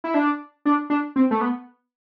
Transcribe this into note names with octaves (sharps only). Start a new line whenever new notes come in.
E4
D4
D4
D4
C4
A3
B3